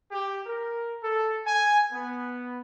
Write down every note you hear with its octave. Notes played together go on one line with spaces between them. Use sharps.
G4
A#4
A4
G#5
B3